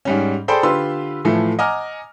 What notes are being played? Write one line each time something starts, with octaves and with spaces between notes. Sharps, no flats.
G#2 G3 C#4
G#4 A4 C5 D5 G5 B5
D3 F4 G4 B4 C6 E6
A2 E3 F3 A3
D#5 F#5 G#5 A#5 D6 F6